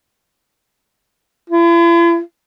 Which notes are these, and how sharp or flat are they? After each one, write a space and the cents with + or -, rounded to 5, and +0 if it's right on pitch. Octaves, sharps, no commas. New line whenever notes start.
E4 +45